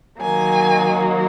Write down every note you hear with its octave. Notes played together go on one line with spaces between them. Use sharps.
D#3 F#3 A#3 G#5